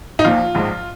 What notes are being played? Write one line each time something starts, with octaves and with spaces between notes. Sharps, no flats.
D#4
A#1 A#2 F3 F4
A#1 G#2 F3